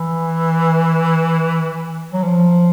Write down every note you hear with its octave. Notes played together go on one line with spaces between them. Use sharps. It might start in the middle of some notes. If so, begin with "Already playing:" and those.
Already playing: E3
F#3
F3